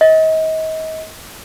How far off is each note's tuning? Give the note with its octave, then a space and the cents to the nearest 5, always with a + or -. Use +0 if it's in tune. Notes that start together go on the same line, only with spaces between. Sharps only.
D#5 +35